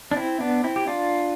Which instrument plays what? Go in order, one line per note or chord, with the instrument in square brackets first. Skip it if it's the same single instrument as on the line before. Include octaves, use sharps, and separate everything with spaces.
[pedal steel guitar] D4
C4 E4
B3 D4
C4 E4
G4
D4 F4